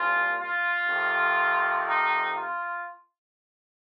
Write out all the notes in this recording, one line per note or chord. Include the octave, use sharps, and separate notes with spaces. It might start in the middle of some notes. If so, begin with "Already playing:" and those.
Already playing: C2 A#2 F3 F4
F4
F2 C3 D#3
D#4
F4